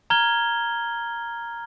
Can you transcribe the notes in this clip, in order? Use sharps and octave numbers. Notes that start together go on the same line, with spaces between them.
A#5 F6 G#6 G7